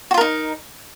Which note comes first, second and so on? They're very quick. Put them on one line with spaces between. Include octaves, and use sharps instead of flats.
F#4 F4 A#4 D#4